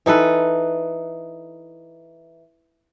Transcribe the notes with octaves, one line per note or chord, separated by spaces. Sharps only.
E3 D#4 A4 B4